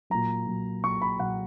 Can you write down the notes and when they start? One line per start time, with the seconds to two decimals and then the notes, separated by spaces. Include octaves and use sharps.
0.10 A#2 F#3 A#5
0.47 A#2 F#3
0.84 A#2 F#3 C#6
1.02 B5
1.20 A#2 F#3 F#5